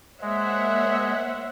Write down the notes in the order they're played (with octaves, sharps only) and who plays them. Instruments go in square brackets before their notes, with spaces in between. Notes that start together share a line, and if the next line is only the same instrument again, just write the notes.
[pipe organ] G#3 [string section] A#3 C5 C#5 [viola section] E5 F#5